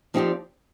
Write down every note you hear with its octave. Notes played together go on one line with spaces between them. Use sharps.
F3 C4 D#4 G4 D5